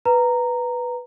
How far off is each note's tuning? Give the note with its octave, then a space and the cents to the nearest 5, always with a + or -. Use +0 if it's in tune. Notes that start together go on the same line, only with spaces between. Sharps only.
B4 +0 A#5 -10